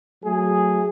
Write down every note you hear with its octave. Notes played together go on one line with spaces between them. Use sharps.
F#3 A3 G#4